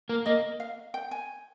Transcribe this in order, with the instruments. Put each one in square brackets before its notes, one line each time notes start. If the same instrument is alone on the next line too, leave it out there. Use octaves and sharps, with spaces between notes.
[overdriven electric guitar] A#3
[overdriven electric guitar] A#3 [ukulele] D#5
[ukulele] F5
G5
G#5